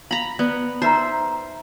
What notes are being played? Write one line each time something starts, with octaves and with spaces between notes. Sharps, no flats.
F5 A#5 B5
B3 D5
D#4 B4 C5 E5 A#5